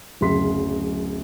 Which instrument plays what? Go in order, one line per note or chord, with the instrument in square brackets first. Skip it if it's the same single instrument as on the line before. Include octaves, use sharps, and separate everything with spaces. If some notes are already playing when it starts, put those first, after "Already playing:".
[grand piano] D1 F#2 C#3 C6 B6